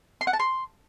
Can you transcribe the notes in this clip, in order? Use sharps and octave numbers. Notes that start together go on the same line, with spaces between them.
C6
F#5
A5
C6